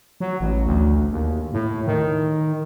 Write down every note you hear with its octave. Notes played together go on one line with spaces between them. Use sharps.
F#3
A1
D2
D#2
A2
D#3